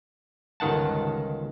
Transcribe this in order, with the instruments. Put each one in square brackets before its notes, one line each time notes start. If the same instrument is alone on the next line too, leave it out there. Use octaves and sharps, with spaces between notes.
[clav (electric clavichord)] G1 C#2 D#3 F#5 A5